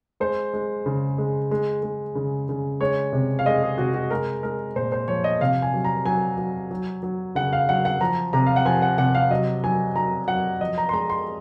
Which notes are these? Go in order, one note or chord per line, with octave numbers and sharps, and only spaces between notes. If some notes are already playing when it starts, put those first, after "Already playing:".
G#3 C5
G#3
C#3
G#3
G#3
G#3
C#3
C#3
G#3 C#5
C3
F5
G#3 D#5
G#4
C3 F#4
F#4
G#3 A#4
G#3 A#4
A#2 C5
C5
F3 C#5
D#5
C3 F5
G#5
F#3
A#5
F#3 G#5
F#3
F#3
F#3
C#3 F#5
F5
F#3 F#5
F#5
F3 A#5
C3 A#5
F5
F#5
F3 G#5
F#5
C3 F#5
F5
F#3 D#5
F#3 G#5
F#3 A#5
F#3 F#5
F3 D#5
A#5
C6
G#3 A#5
C6